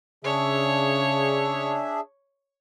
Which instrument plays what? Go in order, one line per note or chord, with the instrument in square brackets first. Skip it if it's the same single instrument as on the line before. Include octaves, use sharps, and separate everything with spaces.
[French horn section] C#3 [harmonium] D4 G#4 E5 [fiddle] C#5